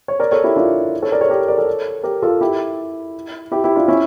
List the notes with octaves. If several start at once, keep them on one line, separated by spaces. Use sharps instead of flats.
C#5
A#4 D5
A4 C#5
E4 G4
D4 F4
A4 C#5
A#4 D5
A4 C#5
G4 A#4
A#4 D5
A4 C#5
G4 A#4
F4 A4
E4 G4
E4 G4
E4 G4
D4 F4
C#4 E4